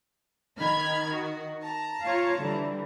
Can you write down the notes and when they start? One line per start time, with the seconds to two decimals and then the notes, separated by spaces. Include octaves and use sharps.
0.57 D#3 B5 F6 G#6
1.12 F#4
1.63 A5 A#5
2.02 F4 C#5 F5
2.38 D3 E3 G3